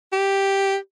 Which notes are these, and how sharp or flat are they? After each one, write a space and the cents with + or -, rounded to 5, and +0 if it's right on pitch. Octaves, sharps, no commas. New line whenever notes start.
G4 +0